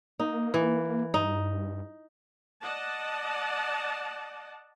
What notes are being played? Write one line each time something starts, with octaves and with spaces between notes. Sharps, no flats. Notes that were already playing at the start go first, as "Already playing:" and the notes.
A#3 D#4
E3
G2 D#4
D5 D#5 F#5 A5